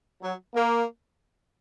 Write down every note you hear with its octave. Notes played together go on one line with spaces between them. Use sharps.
F#3
A#3